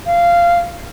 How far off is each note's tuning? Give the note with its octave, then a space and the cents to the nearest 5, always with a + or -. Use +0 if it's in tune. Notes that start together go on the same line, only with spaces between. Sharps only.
F5 -15